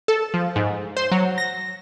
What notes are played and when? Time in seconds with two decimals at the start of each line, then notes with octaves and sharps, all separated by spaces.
0.08 A4
0.34 F3
0.56 G#2
0.97 C5
1.11 F#3
1.38 A#6